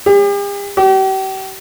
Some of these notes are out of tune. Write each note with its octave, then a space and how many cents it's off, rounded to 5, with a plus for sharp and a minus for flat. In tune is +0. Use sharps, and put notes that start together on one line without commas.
G4 +45
G4 -40